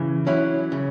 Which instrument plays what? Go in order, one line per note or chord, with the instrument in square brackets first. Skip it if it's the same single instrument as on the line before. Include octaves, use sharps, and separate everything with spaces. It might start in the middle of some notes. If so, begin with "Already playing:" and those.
Already playing: [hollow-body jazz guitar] C#3 [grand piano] E3
[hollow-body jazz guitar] F#3 C#4 E4
C#3